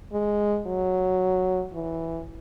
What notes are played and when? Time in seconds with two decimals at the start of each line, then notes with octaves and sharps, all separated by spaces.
0.13 G#3
0.66 F#3
1.73 E3